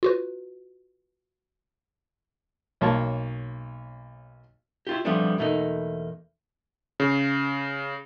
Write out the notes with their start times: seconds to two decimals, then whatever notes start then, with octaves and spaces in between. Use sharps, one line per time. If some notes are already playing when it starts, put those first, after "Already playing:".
0.03 F4 F#4 B4
2.81 B1 A#3 C#5 A5
4.87 E4 F4 G4
5.05 F3 G3 A3 B3 C4 D4
5.38 E2 B2 A3 A#3 D#4
7.00 C#3